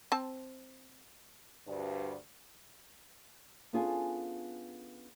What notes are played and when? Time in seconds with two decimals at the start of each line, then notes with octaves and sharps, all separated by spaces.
0.12 C4 A5
1.67 D2 G2
3.73 B3 C#4 D4 F4 G#4 A4